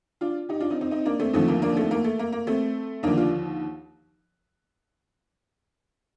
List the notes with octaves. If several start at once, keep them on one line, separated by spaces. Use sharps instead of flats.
D4 F4
D#4 G4
D4 F4
C4 D#4
C4 D#4
C4 D#4
A#3 D4
A3 C4
D#2 D3 F3 A3 C4
A#3
A#3 D4
A3 C4
A#3
A3
A#3
A#3
A3 C4
D#2 D3 F3 A#3 D4
D4 F4